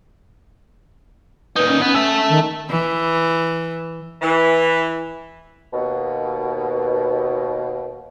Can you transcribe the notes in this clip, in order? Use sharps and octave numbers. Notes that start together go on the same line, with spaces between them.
A#2 D#4 B4
C#4
B3 C#4
A4 E5
D#3
E3
E3
D#2 B2